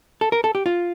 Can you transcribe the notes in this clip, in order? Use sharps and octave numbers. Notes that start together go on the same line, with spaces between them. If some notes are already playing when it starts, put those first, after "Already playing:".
A4
A#4
A4
G4
F4